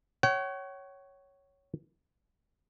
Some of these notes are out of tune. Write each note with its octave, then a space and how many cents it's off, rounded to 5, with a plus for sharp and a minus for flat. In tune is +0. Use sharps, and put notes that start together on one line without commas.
C#5 +0 F#5 +45